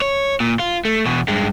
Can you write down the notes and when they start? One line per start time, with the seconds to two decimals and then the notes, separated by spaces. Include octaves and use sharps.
0.02 C#5
0.40 A#2
0.59 F4
0.85 A3
1.06 E2 B2
1.28 G2 G#3